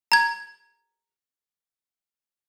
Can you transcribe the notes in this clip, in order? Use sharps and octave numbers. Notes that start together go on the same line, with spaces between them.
A#5 G#6